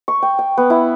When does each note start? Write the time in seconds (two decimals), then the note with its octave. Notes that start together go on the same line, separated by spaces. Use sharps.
0.08 C#6
0.22 G5
0.39 G5
0.57 B3
0.70 E4